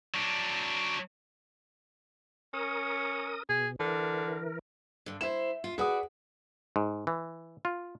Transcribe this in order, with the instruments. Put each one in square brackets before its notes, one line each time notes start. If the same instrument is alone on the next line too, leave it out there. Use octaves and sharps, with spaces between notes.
[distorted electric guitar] F#3 D4
[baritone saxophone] C#4 [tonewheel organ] A#4 D#6
[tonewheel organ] B2 [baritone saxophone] G#4
[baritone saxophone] D3 [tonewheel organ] E3 A#4
[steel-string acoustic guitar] G2 D3
[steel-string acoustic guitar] E4 C5 [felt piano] E5 E7
[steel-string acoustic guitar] F4
[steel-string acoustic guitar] F#4 B4 D5 [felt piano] G#4 F#5 D#6
[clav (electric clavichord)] G#2
E3
F4